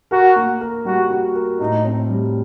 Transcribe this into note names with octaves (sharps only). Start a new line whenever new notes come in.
F#4 A#4
A#3
A#4
G3 F#4
F#4
A#4
A2 D#4
C4
G3